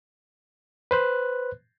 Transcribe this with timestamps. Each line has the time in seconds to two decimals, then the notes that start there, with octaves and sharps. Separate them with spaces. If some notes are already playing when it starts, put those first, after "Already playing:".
0.91 B4 C5 F#6